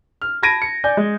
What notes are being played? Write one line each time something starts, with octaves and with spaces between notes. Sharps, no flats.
F6
A5 B5 G#6 A#6 D7 D#7
C#7
D5 G#5 G6
G#3